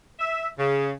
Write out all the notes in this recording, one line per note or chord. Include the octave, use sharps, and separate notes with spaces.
E5
C#3